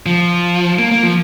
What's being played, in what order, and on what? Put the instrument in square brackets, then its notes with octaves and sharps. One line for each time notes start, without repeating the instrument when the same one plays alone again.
[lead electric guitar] F3
A#3
A#3
F3